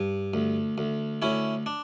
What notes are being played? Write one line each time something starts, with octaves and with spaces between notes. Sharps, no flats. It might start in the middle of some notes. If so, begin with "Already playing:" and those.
Already playing: G2
D2
D2
D2 C#4 E4
D4